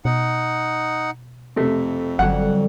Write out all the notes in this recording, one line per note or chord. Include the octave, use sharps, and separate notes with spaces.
B2 D#4 F#5
F2 C3 A3
G1 D3 F#3 G3 F#5